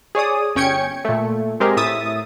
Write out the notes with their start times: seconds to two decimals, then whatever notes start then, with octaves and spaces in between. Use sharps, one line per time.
0.15 G#4 C#5 D5 D#6
0.55 G1 C#4 G5 G#6 C#7
1.05 A#2 A3
1.60 G#3 C4 G4 G#4 A#4
1.77 A2 E5 D#6 A6